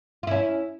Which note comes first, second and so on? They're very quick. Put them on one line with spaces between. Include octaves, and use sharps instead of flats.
F4 E4 C#4